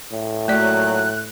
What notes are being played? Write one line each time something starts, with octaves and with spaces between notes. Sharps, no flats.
A2
A#2 F#3 A3 F#4 D5 F#6